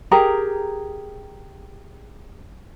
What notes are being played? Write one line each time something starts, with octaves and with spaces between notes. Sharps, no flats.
G4 G#4 A#4 A#5